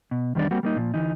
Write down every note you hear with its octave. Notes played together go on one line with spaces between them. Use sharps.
B2
E2 D#3 G3 D4 D5
G3 A#3 C4 F#4
G3 A#3 D#4
A#2 F3
D2 E3 D#4